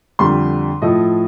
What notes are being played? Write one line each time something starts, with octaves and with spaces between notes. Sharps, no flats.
F2 D3 G3 C6
A2 F3 A3 D#5